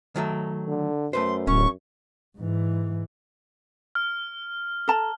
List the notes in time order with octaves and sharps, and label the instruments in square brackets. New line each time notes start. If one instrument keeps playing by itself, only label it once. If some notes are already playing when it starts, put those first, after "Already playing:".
[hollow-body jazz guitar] D#3 F#3 A3
[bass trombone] D3
[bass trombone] F#2 [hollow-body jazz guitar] A3 B4 C5 [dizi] C6
[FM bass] D1 [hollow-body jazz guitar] C#4 [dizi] C#6
[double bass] G#2 E3
[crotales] F6
[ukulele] A4 A5 A#5